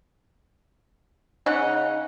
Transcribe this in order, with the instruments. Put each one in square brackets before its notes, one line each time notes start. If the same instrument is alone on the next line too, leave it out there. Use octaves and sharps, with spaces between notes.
[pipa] C#3 F#5 [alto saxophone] D#4